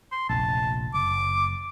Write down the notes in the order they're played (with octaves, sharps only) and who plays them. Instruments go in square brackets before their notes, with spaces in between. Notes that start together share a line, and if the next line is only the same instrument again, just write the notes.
[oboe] C6
[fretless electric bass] F1 A#1 [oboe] A5
[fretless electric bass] F#1 [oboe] D6